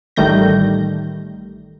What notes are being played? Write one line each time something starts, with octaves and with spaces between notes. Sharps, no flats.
A1 D#3 G3 A3 G6 A#6